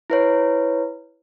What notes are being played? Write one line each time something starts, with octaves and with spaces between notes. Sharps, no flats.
E4 B4 C#5